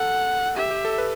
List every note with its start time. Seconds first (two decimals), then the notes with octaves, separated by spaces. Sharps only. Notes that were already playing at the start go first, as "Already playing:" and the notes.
Already playing: A4 F#5
0.57 G4 E5
0.71 G4
0.85 A4
0.98 B4